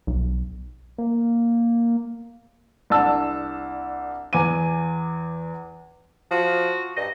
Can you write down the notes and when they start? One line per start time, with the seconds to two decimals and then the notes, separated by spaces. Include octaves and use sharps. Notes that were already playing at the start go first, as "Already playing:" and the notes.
0.07 B1
0.98 A#3
2.90 C2 D4 A5 E6
4.33 E2 G#5 D6 D#7
6.31 F3 F#4
6.97 G2 D#5